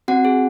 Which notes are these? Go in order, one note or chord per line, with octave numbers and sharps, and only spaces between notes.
C4 F#4 F#5
G#4